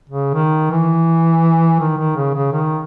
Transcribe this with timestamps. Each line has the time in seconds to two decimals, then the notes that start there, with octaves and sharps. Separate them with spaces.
0.10 C#3
0.34 D#3
0.71 E3
1.80 D#3
1.98 D#3
2.16 C#3
2.35 C#3
2.53 D#3